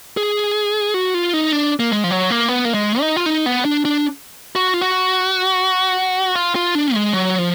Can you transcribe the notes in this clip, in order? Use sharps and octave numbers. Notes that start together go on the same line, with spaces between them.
G#4
F#4
F4
D#4
D4
A#3
G#3
F3
F#3
A#3
B3
A#3
G#3
D#4
F4
D#4
B3
D4
D4
F#4
F4
F#4
F4
F4
D4
G#3
F#3
F3